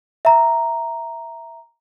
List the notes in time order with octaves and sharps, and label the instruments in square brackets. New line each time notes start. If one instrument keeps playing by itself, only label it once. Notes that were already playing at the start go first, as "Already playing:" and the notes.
[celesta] E5 A#5